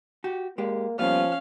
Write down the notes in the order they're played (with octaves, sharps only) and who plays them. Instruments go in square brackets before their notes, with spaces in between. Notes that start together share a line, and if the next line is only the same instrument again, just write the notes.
[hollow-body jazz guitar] F#4 G4
[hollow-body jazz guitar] G#3 G4 [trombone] A#3
[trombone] F3 [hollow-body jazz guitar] G3 A#3 B3 [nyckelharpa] C#4 F5